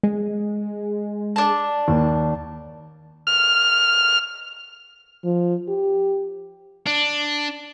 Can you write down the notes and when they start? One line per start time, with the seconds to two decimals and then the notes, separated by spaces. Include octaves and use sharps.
0.03 G#3
1.36 D4 A5
1.88 D#2
3.27 F6
5.24 F3
5.68 G4
6.87 D4